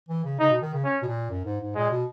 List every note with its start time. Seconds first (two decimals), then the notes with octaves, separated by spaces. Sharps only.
0.09 E3
0.24 C#3
0.39 C#3 D#4
0.51 B2
0.62 D#3
0.74 C#3
0.84 C#4
1.03 B2
1.08 A#2
1.30 F#2
1.45 G#2
1.60 G#2
1.75 A#2 G#3
1.91 B2